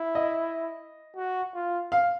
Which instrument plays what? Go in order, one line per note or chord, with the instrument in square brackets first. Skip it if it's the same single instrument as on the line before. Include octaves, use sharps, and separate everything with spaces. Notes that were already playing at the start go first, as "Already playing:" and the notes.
Already playing: [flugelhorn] E4
[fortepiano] D#5
[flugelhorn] F#4
F4
[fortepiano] F5